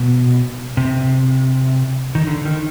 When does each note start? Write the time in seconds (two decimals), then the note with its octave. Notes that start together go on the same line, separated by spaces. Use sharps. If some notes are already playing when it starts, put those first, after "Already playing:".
Already playing: B2
0.77 C3
2.15 D#3
2.27 D3
2.45 D#3